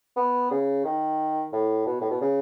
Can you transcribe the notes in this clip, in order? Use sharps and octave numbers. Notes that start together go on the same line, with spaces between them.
B3
C#3
D#3
A2
B2
A2
B2
C#3